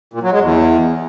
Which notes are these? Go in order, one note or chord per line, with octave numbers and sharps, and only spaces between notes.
A#2
F#3
G#3
E2